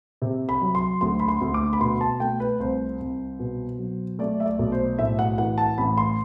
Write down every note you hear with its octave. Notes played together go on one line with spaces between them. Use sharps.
C3
B5
F#3
C6
D2 C6
B5
C6
D2
D6
B5
B2 C6
A5
A3 G5
B4
C2 C5
C2
B2
F#3
A3 D5
E5
D5
B1
C5
A2 E5
F#5
E3 F#5
A5
A1 B5
C6